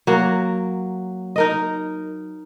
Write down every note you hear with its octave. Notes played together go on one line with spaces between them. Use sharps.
F#3 A#3
D#4 A#4 D#5